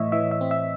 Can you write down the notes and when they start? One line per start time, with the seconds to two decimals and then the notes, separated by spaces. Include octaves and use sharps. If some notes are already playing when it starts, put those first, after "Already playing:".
Already playing: A2 E3 C#5 D#5 E5
0.12 E3 E5
0.31 E5
0.41 C4
0.51 E5